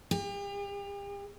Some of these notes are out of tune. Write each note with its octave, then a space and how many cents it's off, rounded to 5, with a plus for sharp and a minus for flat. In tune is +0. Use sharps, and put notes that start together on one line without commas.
G4 +40